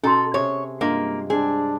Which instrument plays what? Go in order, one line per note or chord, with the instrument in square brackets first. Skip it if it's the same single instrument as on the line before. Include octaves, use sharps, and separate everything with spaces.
[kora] B2 [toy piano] C#4 A#5 C6 [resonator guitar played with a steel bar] A4
[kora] C3 G#4 [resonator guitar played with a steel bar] C#5
[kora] G2 G#3 F4 [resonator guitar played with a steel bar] A#3
[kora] C4 [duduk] D4 [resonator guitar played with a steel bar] G#4